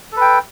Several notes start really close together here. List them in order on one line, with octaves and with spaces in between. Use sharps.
A4 B4 G5